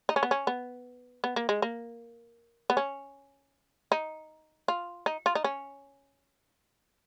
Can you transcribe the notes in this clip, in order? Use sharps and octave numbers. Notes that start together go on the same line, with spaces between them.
D#4
C#4
B3
C#4
B3
B3
A#3
G#3
A#3
B3
C#4
D#4
F4
D#4
F4
D#4
C#4